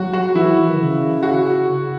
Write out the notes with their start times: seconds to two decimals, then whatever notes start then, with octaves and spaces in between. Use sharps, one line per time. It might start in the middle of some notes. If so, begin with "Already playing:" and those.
Already playing: F#3 F#4
0.13 F#4
0.35 E3 E4
0.57 E3
0.68 D#3
0.79 C#3
1.23 F#4